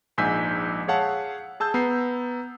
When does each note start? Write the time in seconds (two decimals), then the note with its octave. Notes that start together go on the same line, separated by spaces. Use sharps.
0.18 A#1 G#2 G#5 E6 G6 B6
0.88 G#4 C#5 F5 F#5 A5
1.60 G#4 A5 E6 G6
1.74 B3 A#5 C7